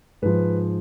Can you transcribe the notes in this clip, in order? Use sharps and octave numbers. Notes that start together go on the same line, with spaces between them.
G#2 F3 B4